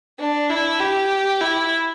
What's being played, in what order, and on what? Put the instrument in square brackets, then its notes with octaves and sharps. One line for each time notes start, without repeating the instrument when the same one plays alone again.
[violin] D4
E4
G4
E4